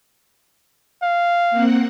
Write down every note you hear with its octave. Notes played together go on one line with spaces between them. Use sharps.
F5
A#3 C4 F#5